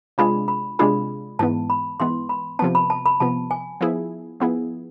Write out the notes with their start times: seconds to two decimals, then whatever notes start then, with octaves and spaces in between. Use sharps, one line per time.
0.18 C3 G#3 D4 F4 G#4 B5
0.48 B5
0.79 C3 G#3 D4 F4 G#4 B5
1.39 G#2 E3 B3 A5
1.70 B5
2.00 G#2 E3 B3 C6
2.29 B5
2.59 C3 F3 B3 A5
2.75 B5
2.90 A5
3.06 B5
3.20 C3 F3 B3 A5
3.51 G#5
3.81 F3 B3 E4 G#4
4.40 F3 B3 E4 G#4